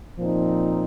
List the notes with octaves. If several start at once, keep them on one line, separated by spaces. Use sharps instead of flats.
A#2 F3 C4 D#4